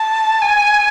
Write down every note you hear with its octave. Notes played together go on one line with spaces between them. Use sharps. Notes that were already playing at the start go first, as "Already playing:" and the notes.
Already playing: A5
G#5